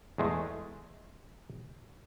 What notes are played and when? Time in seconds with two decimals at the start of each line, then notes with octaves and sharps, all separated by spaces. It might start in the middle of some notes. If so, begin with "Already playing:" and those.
0.18 E2 G#3 A3